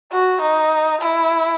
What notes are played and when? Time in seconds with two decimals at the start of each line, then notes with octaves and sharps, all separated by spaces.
0.12 F#4
0.41 D#4
1.01 E4